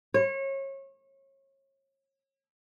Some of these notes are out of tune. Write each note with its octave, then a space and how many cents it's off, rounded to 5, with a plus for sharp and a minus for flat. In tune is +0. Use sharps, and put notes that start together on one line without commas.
C#5 -30